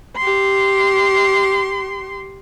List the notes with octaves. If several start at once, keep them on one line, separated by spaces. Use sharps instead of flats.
G4 C6